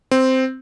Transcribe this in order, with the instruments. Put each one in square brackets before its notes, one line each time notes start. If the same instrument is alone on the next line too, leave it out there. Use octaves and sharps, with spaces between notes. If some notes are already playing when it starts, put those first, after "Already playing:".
[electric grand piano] C4